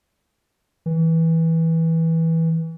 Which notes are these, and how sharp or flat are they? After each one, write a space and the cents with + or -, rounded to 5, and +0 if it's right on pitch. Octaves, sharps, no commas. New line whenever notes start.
E3 -15